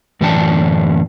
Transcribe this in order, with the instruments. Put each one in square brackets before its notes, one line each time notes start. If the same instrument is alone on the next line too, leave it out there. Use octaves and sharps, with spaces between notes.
[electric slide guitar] F#2 A2 E3 D5 G5 A5